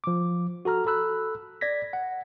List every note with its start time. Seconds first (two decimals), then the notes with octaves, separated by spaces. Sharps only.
0.04 F3 D6
0.65 F#4 A4 A#5 F6
0.86 A4 B5 E6 F#6
1.61 D5 G#6 A#6 B6
1.93 F#5